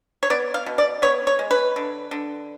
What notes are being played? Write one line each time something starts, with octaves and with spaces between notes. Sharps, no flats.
C#5
B3 D5
F5
B2
D5
B3 C#5
C#5
G#3
B4
D3
D3